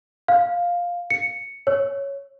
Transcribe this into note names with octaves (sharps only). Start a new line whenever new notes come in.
F5
C#7
C#5